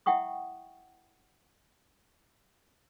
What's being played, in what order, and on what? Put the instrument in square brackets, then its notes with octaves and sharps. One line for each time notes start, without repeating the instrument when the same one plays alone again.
[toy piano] E4 E5 F#5 G5 C#6 D#6